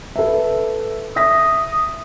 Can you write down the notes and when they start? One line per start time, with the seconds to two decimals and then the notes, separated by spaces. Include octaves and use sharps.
0.16 A4 B4 E5
1.16 E5 D#6 A#6 B6